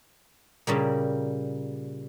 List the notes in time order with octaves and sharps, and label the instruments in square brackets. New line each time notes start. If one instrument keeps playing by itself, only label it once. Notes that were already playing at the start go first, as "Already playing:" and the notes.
[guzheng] A#2 C#3 G3 A#3